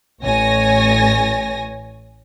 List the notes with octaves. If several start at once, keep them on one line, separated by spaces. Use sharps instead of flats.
A1 C#5 G#5 A#6